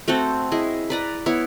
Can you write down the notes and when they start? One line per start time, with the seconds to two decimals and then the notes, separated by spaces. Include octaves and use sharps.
0.08 A3 C4 F#4 A4
0.52 E4 G#4 D#5
0.90 B4 D5 A#5
1.26 B3 E4 C#5